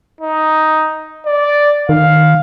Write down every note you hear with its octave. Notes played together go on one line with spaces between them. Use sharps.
D#4
D5
D#3 F5